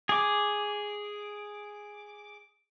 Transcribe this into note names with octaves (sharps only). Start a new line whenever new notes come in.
G#4 D6